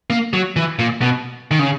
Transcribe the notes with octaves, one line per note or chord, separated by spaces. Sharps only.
A#3
F#3
E3
A#2
B2
D#3
C#3